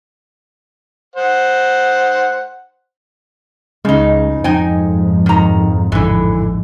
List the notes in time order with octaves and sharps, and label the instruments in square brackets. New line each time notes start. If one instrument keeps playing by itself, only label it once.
[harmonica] C5 F#5
[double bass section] C#2 [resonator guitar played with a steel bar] C#3 D#4 [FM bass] G#3
[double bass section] F2 G#2 [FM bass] F3 [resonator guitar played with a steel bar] D#4 G5 G#5
[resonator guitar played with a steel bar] D#3 A#5
[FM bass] A1 [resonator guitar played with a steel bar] D3 E3